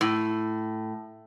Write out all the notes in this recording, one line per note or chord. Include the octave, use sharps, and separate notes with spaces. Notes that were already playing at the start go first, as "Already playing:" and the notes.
A2